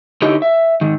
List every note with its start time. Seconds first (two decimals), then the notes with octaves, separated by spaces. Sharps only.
0.22 D3 D#4 E4 G4 C#5 D#5
0.42 E5
0.81 G#2 D#3